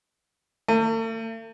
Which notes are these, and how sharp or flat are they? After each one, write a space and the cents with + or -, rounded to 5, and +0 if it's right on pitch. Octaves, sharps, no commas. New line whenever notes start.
A3 +45